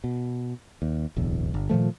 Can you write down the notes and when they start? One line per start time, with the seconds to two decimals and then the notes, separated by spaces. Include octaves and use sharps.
0.04 B2
0.82 D#2
1.16 D1 B1 E2
1.54 G1
1.70 A#2 D#3 F3 A3